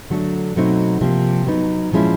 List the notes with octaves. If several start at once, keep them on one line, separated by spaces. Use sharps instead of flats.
D3 F#3 A3 D4
B2 F#3 A3 C4 D#4
C3 F3 A#3
F#3 B3 D#4
A#2 F3 G#3 C#4 E4